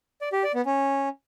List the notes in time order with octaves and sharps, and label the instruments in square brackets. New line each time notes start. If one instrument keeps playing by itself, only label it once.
[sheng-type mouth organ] D5
G4
D5
B3
C#4